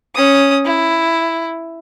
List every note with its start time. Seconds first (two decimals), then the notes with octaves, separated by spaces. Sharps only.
0.15 C#4 D#6
0.65 E4